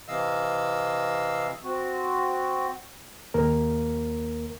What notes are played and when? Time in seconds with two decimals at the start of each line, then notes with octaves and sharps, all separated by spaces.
0.08 C3 E3 D#5 F5 E6
1.64 C4 F#4
3.34 D#2 A#3 A#4